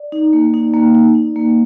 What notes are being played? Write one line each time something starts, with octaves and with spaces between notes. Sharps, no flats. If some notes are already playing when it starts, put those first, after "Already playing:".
Already playing: D5
D#4
A#3
D#4
A#3
D#4
D#4
A#3